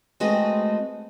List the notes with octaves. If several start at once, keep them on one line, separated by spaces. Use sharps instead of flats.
G#3 A3 C4 F#4 B4 D#5